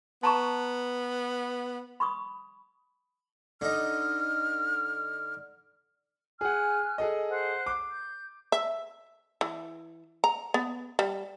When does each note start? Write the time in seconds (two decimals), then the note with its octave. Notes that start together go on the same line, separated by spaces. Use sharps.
0.23 B3 A5 A#5 C#6
2.00 B5 C#6 D#6
3.61 D3 D#4 F6
6.41 G#4 F#5 G#5 F6 F#6
6.98 G#4 A4 D#5
7.30 C5 F#5 F#6
7.66 D6
7.89 G6
8.52 E5
9.41 E3
10.24 A#5
10.54 B3
10.99 G3